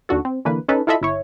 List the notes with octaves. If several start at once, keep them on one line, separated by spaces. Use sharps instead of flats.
D#2 D3 F#4 A4
C4
D3 E3 A#3 B4
C#4 D#4 A4 B4
E4 F4 A4 D#5 E5 B5
G1 E4 C#5